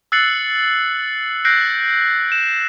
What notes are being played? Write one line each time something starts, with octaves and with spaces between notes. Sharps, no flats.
E6 F#6 A6 C7 C#7 F#7
E6 F#6 G6 A#6 C7 D7
E7